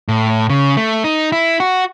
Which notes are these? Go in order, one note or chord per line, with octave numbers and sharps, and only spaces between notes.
A2
C#3
A3
D#4
E4
F#4